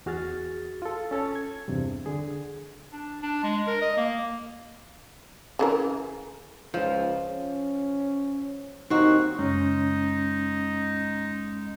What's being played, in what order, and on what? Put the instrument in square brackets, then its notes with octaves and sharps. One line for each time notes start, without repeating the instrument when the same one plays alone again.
[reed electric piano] E2 F#4 G#4 F6 A6
F4 A4
C#4 A4 C#5 A6
G#6
E2 G2 C3
D3 G#4
[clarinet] D4
D4
G#3
A#4
D#5
A#3
[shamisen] C#3 E3 A#4
[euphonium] C#2 [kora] F3
[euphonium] C#4
[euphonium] D#2 [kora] C4 F#4 [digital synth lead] D#4
[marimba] F#2 C#3 [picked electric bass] G#3 [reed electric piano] C#4 [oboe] D#4